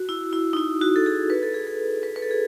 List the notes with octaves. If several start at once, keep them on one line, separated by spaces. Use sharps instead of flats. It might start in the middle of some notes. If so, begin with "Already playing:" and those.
Already playing: F#4
E4
E4
D#4
E4
F#4
A4
G#4
B4
A4
G#4
A4
B4
B4
A4
G#4